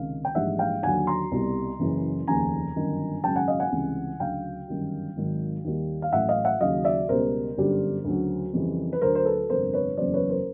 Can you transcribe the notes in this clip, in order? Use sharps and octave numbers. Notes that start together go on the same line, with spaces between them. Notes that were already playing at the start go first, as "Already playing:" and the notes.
Already playing: C#2 C3 D#3 F5
G5
A#1 G#2 E3 G3 E5 F#5
F5 G5
D#2 D3 F#3 F#5 G#5
A#5 C6
C2 B2 G3
F#1 F#2 C#3 E3
F1 D#2 C#3 G#5 A#5
G1 F#2 D#3
G#1 F#2 C#3 F#3 G5 A5
F#5 G#5
D#5 F5
F#5 G#5
C#2 C3 E3 G3
D2 C#3 F#3 F5 G5
G1 F#2 D#3 G3
G#1 G#2 D#3 F#3
D#2 D#3 G3
F5
A1 A2 F#3 E5 F#5
D#5 F5
E5 F#5
D#2 C#3 F#3 D#5 F5
D5 E5
C#2 B2 G3 A#4 C5
G1 F#2 D3 G3
D2 C#3 F#3
F2 C#3 E3 G3
B4
D2 D3 F#3 A#4 C5
C5
A4 B4
G1 F2 C3 A#4 C5
B4 C#5
F#1 E2 C#3 F#3 C5 D5
B4 C#5
A#4 C5